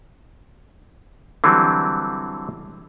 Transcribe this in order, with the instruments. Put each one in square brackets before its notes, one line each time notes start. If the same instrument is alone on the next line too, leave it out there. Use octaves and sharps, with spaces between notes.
[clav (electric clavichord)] D3 E3 F#3 G3 C4